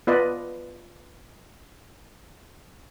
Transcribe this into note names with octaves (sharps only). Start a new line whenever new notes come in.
B3 F4 B4 D5 D#5